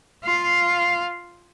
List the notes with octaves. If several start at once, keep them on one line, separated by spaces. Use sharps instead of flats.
F4 F5